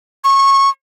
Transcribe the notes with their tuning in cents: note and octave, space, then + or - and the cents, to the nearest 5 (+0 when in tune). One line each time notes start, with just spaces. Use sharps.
C#6 -20